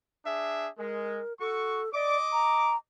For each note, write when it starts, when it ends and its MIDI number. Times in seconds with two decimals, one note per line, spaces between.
0.25 0.68 62
0.25 0.68 68
0.25 0.68 76
0.78 1.20 56
0.78 1.33 70
1.40 1.81 66
1.40 1.92 69
1.40 1.81 85
1.94 2.17 74
1.94 2.74 75
1.94 2.74 86
2.32 2.76 82